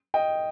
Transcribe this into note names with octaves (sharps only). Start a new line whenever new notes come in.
D#5 G5